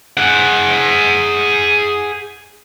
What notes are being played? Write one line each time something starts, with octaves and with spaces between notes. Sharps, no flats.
G#4 F#5